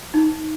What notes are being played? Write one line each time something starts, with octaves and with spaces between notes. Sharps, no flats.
D#4